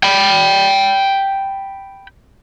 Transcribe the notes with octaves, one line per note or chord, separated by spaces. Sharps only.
G5 B5